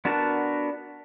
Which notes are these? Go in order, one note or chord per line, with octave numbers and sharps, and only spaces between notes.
B3 D4 F#4 A#4 A5